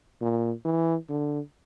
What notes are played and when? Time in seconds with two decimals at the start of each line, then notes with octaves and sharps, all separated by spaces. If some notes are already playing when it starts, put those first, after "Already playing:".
0.22 A#2
0.65 E3
1.09 D3